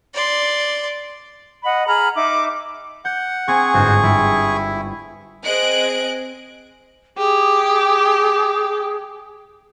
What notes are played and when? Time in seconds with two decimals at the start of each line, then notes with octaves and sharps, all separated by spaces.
0.14 D5 C6
1.64 D#5 F#5 B5
1.87 G#4 A#5 B5 F6
2.15 D#4 E5 D6
3.05 F#5 G6
3.48 C4 G#4 G#5 C#6
3.74 G1 G#2 F#4 C5
4.03 G3 E4
5.44 C4 G#4 D#5 F#6 D7
7.17 G4 G#4